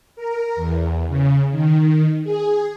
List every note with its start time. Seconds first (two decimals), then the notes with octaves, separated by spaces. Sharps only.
0.16 A#4
0.56 E2
1.08 C#3
1.51 D#3
2.24 G#4